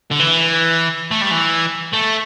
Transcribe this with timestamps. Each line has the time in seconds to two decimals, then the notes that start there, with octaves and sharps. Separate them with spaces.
0.11 D3
0.20 E3
1.11 A3
1.21 G3
1.31 E3
1.93 A3